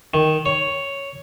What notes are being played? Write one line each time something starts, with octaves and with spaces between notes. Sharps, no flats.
D#3
C#5